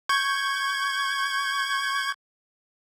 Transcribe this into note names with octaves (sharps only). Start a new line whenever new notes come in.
C#6 G6 G#6